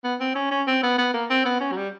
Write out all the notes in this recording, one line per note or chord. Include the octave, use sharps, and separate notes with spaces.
B3
C4
C#4
C#4
C4
B3
B3
A#3
C4
B3
C#4
F#3
G3